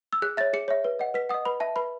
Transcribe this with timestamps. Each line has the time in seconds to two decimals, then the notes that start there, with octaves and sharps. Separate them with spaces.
0.13 E6
0.22 G#4 F#6
0.37 C#5 E5 A6
0.53 G#4 C#7
0.68 C#5 E5
0.84 B4
0.99 D#5 F#5
1.14 B4 B6
1.29 D#5 F#5 D#6
1.45 B4 B5
1.60 E5 A5
1.76 B4 B5